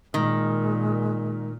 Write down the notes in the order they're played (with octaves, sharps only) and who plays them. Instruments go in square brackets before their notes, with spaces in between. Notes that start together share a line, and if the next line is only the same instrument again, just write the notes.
[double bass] A#2 [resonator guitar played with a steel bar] D#3 [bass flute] G#3